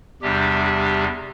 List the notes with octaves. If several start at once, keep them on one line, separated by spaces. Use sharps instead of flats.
E2 C3 G3 D4 G4
G4